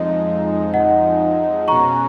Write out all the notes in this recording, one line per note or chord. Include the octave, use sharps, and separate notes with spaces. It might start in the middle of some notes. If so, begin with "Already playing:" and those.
Already playing: F2 F3 G#3 D#4 D#5
D#5 F#5
B2 G#3 C#4 F#4 A#5 C#6